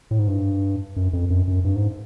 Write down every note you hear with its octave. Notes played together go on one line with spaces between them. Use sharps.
A2
G#2
G2
F#2
F2
F#2
F#2
G2
G#2